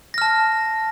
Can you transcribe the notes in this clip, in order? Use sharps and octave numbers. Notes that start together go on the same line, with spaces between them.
A5 F6 A#6